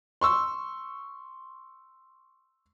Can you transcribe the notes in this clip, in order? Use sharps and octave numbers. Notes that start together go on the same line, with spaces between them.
C6 C#6 E6